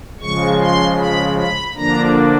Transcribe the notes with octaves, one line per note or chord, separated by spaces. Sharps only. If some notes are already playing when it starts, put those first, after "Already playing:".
C#3 F3 G#3 C#6
C6
B5
B5
D3 F3 A#3 D4 A#5